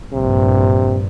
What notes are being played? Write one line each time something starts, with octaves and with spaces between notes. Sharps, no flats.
A#1 G2 C3